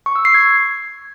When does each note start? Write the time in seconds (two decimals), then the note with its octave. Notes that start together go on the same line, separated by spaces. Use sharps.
0.06 C#6
0.16 E6
0.25 C7
0.34 G#6